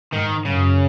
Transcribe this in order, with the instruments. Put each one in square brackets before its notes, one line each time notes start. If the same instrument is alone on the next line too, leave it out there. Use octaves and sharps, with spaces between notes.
[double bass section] G#2 [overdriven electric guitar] D#3
[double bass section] F#2 [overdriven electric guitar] C#3